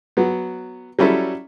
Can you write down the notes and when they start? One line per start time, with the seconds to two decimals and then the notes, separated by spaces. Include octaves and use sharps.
0.17 F#3 B3
0.99 F#3 G3 C#4 E4 A4